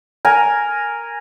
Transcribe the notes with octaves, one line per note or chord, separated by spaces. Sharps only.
A#4 G#5